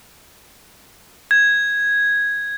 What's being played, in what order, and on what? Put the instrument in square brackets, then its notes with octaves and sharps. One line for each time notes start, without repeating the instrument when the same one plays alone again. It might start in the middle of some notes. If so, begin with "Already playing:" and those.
[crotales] G#6